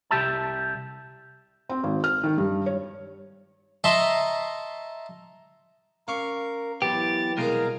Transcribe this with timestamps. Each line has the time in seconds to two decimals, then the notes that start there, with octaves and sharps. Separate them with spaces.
0.11 C2 G4 E5 A5
1.69 C4
1.84 G#1
2.04 F6
2.24 D#3
2.38 G2
2.66 C#5
3.84 D#5 E5 A5 A#5 C6 C#6
6.08 C#4 A#4 F5 C#6 D6
6.82 E3 F#3 B3 G4 A6
7.37 C2 B2 G#3 G#4 A#4 F5 A#5